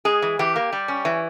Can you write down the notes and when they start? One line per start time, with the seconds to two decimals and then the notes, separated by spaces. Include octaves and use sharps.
0.05 G#3 G#4
0.22 E3
0.39 E3 G4
0.56 A#3
0.73 G3
0.88 C#4
1.05 E3